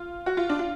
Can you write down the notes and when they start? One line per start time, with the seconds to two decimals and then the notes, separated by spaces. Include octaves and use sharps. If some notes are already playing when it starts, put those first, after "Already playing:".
Already playing: F4
0.26 F#4
0.37 F4
0.49 D4
0.59 F4